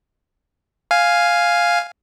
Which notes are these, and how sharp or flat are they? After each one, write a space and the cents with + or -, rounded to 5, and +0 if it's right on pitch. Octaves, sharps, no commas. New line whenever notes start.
F5 +0 G#5 +0